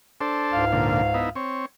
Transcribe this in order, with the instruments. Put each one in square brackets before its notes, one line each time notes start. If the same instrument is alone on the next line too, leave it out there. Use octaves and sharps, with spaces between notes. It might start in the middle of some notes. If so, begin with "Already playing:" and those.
[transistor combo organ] D4 A4 C5
[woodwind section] C#2 G#2 F5
[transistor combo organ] A#2 D3
B3 D#4 E4
C4 C#5